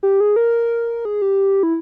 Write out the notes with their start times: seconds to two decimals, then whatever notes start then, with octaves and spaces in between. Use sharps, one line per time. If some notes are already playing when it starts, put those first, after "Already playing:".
0.03 G4
0.20 G#4
0.36 A#4
1.05 G#4
1.22 G4
1.63 E4